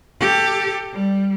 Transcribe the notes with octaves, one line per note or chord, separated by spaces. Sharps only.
G4 A4
G3